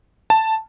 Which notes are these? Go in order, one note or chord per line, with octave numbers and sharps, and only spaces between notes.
A5